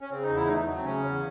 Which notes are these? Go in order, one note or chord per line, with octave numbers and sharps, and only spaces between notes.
C#4
C#3 C4
D#4
E2
E4
A3 D#4
D#4
F#3
C4
C#3 C#4
E2